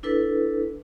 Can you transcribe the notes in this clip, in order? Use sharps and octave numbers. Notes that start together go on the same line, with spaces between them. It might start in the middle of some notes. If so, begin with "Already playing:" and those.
D4 E4 A4 B4